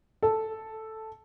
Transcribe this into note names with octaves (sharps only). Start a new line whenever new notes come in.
A4